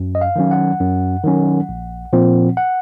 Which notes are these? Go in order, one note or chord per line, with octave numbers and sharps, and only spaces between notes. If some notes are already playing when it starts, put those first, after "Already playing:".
Already playing: F#2
D#5
F5
D#3 F#3 C#4
F#5
F#2
D#3 F#3 C#4
A#1
A#2 F3 C4
F#5